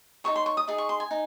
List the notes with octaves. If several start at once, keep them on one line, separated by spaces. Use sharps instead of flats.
D#4 G#4 C#5 C#6
C6
C#6
D#6
D#4 G#4
C#6
C6
G#5
D#4